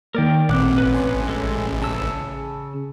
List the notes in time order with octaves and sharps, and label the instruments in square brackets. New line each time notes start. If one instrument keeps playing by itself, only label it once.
[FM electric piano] D#3 A#3 [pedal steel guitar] A#4 D5 G5
[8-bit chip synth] A1 [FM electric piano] A#2 C4 [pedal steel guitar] F#5 D6 F#6
[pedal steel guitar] B3 C#4 B4
[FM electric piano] G#5 C6
[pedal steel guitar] G#3 C#4 A4
[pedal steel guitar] C#3 E6 [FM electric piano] A5